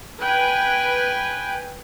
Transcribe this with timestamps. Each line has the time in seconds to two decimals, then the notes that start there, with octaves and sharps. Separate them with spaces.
0.21 B4 G5 G#5